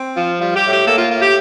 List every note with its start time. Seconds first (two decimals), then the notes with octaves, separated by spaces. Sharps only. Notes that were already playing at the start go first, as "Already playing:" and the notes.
Already playing: C4
0.17 F3 F4
0.40 G3 F4
0.56 G4
0.63 A2
0.71 G4
0.87 A#3 A4
0.98 F4
1.10 A2 F4
1.22 G4